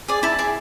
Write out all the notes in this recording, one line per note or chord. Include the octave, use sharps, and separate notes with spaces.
G#4 D5
E4 A5
G#4 D5